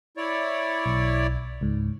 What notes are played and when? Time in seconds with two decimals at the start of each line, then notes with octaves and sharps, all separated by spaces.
0.17 E4 C#5 D5
0.86 B1
1.61 C#2 G#2